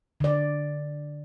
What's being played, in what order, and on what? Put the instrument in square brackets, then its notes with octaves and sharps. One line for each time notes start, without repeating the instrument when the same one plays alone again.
[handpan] D3 D5